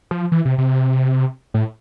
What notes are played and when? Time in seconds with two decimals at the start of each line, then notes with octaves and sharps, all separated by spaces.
0.11 F3
0.32 E3
0.45 C3
0.58 C3
1.54 A2